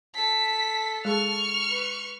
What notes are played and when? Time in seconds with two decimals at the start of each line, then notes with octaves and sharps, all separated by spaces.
0.15 A4 A5 B6
1.05 G#3 G#4 C#6 F6
1.69 B4